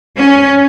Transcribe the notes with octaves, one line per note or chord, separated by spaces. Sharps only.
C#4